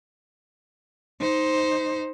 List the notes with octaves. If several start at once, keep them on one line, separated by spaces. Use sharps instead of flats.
D#4 C5